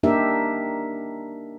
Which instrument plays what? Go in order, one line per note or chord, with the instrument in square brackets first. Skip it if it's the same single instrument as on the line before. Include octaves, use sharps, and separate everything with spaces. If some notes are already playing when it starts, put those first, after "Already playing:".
[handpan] A#3 D4 D#4 G4 A#4 E5